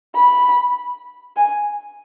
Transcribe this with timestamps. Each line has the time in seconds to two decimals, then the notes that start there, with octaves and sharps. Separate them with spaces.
0.16 B5
1.37 G#5